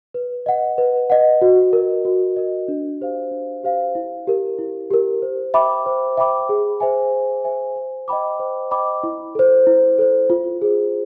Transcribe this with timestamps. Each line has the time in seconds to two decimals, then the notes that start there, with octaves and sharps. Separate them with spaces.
0.14 B4
0.46 D#5 F#5
0.78 B4
1.10 D#5 F#5
1.42 F#4
1.73 A#4 D#5
2.05 F#4
2.36 A#4 D#5
2.68 D4
3.01 G4 C5 F5
3.31 D4
3.63 G4 C5 F5
3.95 E4
4.27 G4 A#4
4.59 E4
4.91 G4 A#4
5.22 C5
5.54 E5 G5 B5 D6
5.86 C5
6.17 E5 G5 B5 D6
6.49 G#4
6.80 C5 E5 G#5
7.13 G#4
7.44 C5 E5 G#5
7.76 C5
8.08 D#5 G5 B5 D6
8.40 C5
8.71 D#5 G5 B5 D6
9.03 E4
9.35 A4 C5
9.67 E4
9.99 A4 C5
10.30 F4
10.62 G#4 C5